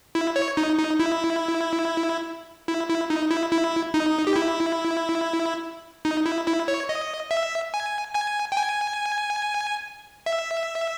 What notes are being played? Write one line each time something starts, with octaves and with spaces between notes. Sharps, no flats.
E4
C#5
D#4
D#4
E4
E4
E4
D#4
E4
E4
D#4
G4
E4
D#4
E4
E4
C#5
D#5
E5
G#5
G#5
G5
G#5
E5